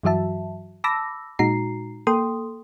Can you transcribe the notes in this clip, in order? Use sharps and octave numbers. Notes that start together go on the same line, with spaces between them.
G2 E3 F#3 F#4 E5 A5
A5 B5 D6 E6 A#6
A#2 G#3 D#4 F#4 A#5 C7
A#3 A4 G5 C6 D#6